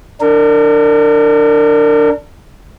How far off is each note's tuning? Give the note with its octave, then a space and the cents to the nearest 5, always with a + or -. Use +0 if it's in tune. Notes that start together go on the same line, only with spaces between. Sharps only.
D4 +0 A#4 -35